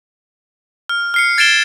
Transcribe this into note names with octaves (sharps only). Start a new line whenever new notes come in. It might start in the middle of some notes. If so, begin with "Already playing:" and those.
F6
F6 C7 C#7
G#6 A6 C7 D7 E7 G7